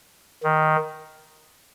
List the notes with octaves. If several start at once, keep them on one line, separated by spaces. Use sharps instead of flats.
D#3